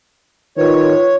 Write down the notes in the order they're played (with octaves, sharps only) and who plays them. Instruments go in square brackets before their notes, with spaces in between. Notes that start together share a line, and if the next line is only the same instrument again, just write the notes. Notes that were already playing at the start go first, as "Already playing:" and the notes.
[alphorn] D#3 [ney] F4 [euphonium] B4 [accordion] C#5